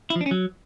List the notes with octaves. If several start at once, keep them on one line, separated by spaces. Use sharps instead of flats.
E4
F3
D4
C#4
F#3